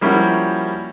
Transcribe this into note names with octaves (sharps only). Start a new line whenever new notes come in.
F3 G3 A#3 C#4 E4 F#4